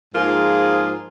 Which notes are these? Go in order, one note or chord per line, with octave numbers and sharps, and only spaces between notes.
G#2 F3 A#3 F4 G#4